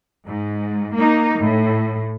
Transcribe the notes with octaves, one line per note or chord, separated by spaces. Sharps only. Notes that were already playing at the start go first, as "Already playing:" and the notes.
G#2
A#3 D#4
A2